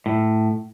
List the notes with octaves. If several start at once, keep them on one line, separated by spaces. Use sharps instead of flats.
A2